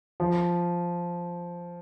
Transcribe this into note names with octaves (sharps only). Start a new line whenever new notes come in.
F3